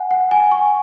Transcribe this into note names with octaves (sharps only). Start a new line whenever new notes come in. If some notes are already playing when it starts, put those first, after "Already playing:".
Already playing: F#5 G#5
F#5
G#5
C#6